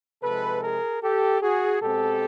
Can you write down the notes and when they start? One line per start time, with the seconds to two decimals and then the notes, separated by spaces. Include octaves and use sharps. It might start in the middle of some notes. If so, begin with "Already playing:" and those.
0.23 C3 F3 G#3 A4 B4
0.63 G#4 A#4
1.02 G4 A4
1.42 F#4 G#4
1.81 B2 G#3 C4 G4 A4